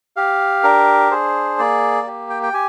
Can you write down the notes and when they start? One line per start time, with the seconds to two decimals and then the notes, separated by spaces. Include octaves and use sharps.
0.16 G4 F5
0.64 D4 A#4
1.11 G#4 C5
1.59 A#3 D5
2.06 G4
2.30 G5
2.43 G5
2.53 G4 G#5